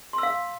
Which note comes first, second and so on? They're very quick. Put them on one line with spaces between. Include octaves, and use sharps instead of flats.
C6 E6 F5